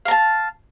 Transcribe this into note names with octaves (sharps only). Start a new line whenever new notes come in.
F5 A5 A#5